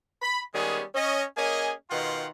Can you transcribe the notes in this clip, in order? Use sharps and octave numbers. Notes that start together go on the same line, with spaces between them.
B5
D#3 G3 G#3 B3 C#4 G#4
C#4 D#5
A#3 C#4 G#4 D#5 G#5
B2 D#3 F4 F#5 G5 C6